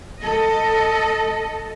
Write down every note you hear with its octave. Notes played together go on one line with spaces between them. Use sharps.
A4 D#5